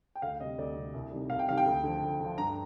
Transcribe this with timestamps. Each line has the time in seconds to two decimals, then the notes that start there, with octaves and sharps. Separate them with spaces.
0.15 G5
0.22 D2 F5
0.40 C3 G3 D#5
0.58 D2 D5
0.76 C3 G3
0.94 C2
1.12 C3 D#3 G3
1.30 C2 F5
1.39 G5
1.48 C3 D#3 G3 F5
1.57 G5
1.66 D2
1.84 D3 F3
2.02 D2
2.20 D3 F3
2.38 G2 A#5